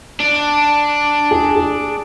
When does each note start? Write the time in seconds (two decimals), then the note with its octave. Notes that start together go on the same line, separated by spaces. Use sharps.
0.20 D4
1.31 G#4
1.56 G#4